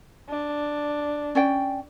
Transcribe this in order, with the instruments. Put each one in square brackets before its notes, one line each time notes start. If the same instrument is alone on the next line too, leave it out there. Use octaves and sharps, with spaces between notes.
[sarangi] D4
[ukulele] C#4 D5 G5